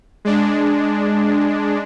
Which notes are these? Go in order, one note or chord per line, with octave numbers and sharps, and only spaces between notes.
G#3 D4